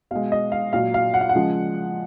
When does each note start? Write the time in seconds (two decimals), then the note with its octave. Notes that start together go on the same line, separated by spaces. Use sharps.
0.11 B2 G#3 F5
0.32 D#5
0.52 F5
0.73 A#2 F#3 F5
0.94 F5
1.14 F#5
1.21 F5
1.29 F#5
1.35 C#3 F3 G#3